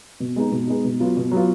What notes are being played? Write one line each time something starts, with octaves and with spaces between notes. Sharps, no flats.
B2
G#3 B3 D#4
B2
G#3 B3 D#4
B2
F#3 B3 F4
B2
F#3 B3 F4